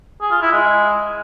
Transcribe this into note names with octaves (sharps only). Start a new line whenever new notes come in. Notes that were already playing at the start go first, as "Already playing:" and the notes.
G#4
F4
E4
G#3